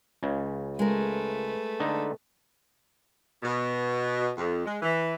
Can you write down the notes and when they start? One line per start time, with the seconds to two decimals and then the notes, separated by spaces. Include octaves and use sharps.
0.23 C#2 C#3
0.79 G#3 A3 A#4 B4
1.80 D3 D#4
3.43 B2
4.38 F2
4.65 G#3
4.82 E3